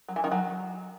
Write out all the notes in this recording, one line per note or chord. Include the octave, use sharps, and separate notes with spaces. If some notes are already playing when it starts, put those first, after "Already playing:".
F#3
E3
D#3
F#3